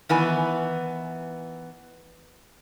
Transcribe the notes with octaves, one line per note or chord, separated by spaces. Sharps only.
D#3 E3 B3 G#5